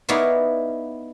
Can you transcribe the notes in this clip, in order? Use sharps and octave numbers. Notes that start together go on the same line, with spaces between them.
B3 D#4 E4 C#5 D5 F5